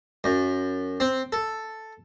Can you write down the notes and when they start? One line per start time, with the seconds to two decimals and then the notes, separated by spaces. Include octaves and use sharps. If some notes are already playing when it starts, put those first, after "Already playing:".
0.24 F#2
1.00 C4
1.32 A4